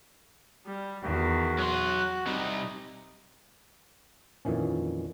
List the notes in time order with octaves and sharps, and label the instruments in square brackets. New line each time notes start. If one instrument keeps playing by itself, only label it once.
[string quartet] G3
[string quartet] E2 D#3 [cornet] F#4
[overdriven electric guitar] F#3 C6 [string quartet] F#6
[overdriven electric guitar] C3 G3 [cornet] D#4
[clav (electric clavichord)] F2 A#2 D#3 E3 C#4